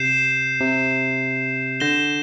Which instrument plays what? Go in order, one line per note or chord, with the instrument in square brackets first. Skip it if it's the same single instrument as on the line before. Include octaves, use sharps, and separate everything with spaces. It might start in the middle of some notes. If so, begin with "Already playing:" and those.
Already playing: [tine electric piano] C3 [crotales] G6 C7 E7
[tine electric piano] C3
[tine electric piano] D3 [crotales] G6 A#6 E7 G7